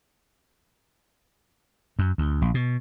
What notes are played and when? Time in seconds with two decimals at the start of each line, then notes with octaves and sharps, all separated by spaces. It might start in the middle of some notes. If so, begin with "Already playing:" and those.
1.99 F#2
2.18 D2
2.42 A#1
2.54 B2